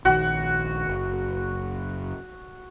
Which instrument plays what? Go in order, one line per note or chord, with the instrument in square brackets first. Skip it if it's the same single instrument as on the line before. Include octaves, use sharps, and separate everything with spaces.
[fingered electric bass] A#1 D#3 [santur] F#4
[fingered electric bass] F#1